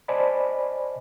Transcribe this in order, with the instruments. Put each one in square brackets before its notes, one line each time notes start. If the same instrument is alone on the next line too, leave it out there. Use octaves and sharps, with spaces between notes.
[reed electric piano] C5 D5 D#5 G#5 A5 B5